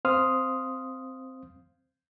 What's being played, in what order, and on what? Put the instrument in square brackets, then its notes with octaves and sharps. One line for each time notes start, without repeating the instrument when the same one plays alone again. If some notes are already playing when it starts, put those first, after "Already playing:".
[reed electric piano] C4 C5 F5 C6 D#6 F6